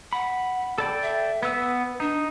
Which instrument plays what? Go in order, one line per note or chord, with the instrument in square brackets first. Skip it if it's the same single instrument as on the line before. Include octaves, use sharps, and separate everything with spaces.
[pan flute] F#5 [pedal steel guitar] B5
[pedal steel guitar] A4 D5 G5 [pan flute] B5
[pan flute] E5
[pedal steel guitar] B3 E6 [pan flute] B4
[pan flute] D4 [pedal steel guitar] D#4